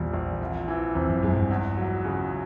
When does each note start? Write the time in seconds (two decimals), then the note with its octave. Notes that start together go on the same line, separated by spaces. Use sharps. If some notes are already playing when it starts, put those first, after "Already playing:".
Already playing: A#1 E2 A#2 G3
0.14 A#1
0.41 C2
0.68 E3
0.95 E2 C3
1.10 F2
1.23 F#2 G#3
1.36 G2
1.51 E2
1.77 F#3
2.05 C#3